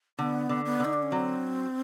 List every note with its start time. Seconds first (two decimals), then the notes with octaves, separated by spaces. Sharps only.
0.19 D3 B3
0.49 D3
0.65 B3
0.80 D3 D#4
0.93 D4
1.03 C#4
1.11 F#3 C4